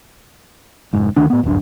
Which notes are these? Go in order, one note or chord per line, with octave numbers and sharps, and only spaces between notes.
F1 G#2
D2 D#3 D4
A2 B3
D1 G1 F#2 D4